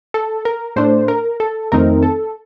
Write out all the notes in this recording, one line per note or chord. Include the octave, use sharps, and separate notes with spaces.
A4
A#4
A2 A3 D4 C5
A#4
A4
F2 D#3 A3 C4 D#4 A#4
A4